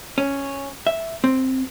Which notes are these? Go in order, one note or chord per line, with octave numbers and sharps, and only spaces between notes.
C#4
E5
C4